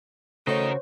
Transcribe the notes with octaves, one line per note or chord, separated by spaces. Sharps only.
C#3 A3 F#4 A#4 C5 C#5 D#5